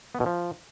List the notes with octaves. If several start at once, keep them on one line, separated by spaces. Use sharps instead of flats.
B3
B2
F3